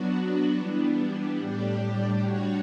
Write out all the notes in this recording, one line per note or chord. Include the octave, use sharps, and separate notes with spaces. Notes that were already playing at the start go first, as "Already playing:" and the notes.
Already playing: F#3 B3 D4 F#4
E3 G3 B3 D4
A2 G3 D4 G4
G3 D4 F#4 C#5